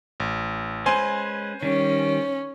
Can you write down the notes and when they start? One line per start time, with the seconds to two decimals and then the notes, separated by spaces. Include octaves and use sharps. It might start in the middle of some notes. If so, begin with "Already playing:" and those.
0.20 A1
0.86 G#3 C#4 B4 C5 G#5 C6
1.63 D#3 G3 C#4